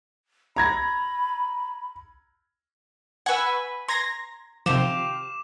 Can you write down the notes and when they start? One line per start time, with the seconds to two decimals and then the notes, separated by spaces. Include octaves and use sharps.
0.56 A#5 B5 G#6 A#6
3.26 B4 F#5 G#5 C#6 E6
3.88 A#5 C6 G#6 A#6
4.66 C3 D#3 F3 G4 F5 C6 D6 E7